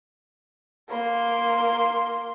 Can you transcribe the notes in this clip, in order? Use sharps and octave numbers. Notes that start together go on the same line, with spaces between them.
A#3 C6